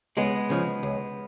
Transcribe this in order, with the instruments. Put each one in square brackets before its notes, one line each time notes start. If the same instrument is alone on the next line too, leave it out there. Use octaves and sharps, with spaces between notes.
[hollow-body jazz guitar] C#2 G#3 B3
C#3 F3
C#2